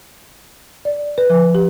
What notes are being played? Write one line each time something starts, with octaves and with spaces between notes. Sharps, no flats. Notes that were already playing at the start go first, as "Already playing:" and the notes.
D5
B4
F3
G4